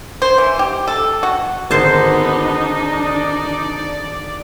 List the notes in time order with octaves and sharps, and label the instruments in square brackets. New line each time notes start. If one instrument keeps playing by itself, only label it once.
[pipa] C5
E3
G4
A4
F#4
[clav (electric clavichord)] G#1 D3 [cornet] B3 [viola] D4 D#4 [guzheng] C5 A5
[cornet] D5